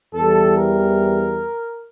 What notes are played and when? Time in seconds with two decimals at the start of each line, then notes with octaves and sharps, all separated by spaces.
0.14 E2 E3 G3 A4
0.55 A#4